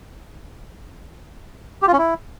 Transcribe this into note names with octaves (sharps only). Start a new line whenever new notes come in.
G4
F4
C#4
E4